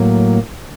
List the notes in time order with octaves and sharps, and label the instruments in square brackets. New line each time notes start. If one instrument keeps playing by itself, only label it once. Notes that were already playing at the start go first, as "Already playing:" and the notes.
Already playing: [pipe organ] A2 F#3 A#3